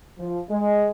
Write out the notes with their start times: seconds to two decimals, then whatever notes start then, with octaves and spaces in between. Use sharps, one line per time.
0.19 F3
0.50 G#3